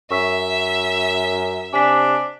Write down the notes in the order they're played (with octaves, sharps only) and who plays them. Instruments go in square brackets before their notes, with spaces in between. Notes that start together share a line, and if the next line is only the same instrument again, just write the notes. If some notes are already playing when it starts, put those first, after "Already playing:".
[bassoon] F#2 [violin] E5 [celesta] C#6 E6 B6
[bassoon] C3 [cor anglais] D4 [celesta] G#5 B6